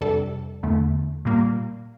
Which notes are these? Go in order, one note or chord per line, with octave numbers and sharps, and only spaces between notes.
F2 C3 G3 D4 A4
E2 D3 A3
A#2 G3 A#3